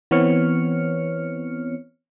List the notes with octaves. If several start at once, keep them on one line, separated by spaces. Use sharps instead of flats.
E3 B3 C4 C#5 F6 C#7